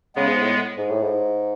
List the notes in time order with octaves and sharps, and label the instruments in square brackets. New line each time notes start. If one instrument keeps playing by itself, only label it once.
[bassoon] C#3 [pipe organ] G#3 B3
[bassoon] G#2
A2
G#2
A2
G#2